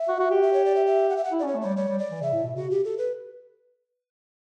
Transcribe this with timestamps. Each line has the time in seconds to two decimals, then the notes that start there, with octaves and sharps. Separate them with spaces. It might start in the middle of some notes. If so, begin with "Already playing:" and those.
Already playing: E5
0.09 F#4
0.20 F#4
0.31 G4
0.42 E5
0.53 C#5
0.65 D5
0.76 E5
0.87 E5
1.10 F#5
1.17 E5
1.24 F#5
1.32 E4
1.39 D5
1.43 C#4 C#5
1.55 A3
1.62 G3 C#5
1.76 G3 C#5
1.88 G3
1.99 D5
2.11 E3
2.21 C#3 E5
2.33 A2
2.44 B2
2.56 C#3 F#4
2.71 G4
2.85 A4
2.98 B4